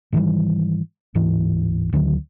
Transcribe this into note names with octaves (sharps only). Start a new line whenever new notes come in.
G#2 D#3 E3 G3
D1 G#2 E3
D2 D3 D#3 F#3